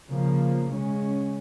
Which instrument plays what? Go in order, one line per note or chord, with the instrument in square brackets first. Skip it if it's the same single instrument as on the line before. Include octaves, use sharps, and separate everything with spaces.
[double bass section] C#3 F3 A#3
C#3 G#3 C#4